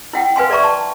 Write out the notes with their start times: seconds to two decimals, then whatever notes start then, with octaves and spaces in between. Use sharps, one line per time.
0.13 E4 F#5 G5
0.36 B4 F5 G#5 C6
0.50 A4 D5 E5 A#5 C#6
0.64 A5